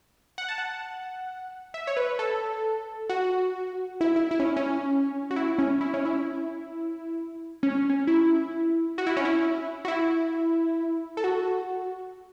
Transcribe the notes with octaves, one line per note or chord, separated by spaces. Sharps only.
F#5
A5
F#5
E5
C#5
B4
A4
F#4
E4
E4
E4
C#4
C#4
F#4
E4
C#4
E4
C#4
E4
C#4
C#4
E4
F#4
E4
C#4
E4
F#4
E4
A4
F#4